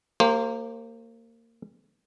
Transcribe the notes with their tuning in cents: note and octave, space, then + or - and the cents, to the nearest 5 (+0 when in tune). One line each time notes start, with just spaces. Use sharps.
A#3 -25 G4 +0 C5 +20